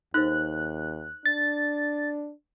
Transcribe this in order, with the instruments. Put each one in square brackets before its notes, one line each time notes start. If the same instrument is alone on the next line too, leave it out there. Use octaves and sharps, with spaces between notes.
[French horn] D#2 [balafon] D#4 A4 C5 [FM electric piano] F#6
[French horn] D4 [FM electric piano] A6